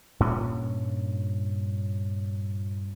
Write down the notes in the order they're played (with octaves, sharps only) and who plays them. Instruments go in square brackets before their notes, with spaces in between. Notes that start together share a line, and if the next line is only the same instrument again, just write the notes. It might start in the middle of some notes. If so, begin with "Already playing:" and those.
[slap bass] G2 A#2 C#4